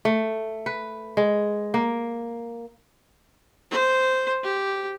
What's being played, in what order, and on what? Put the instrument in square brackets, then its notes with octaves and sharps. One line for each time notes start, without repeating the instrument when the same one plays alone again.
[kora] A3
B4
G#3
A#3
[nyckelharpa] C5
G4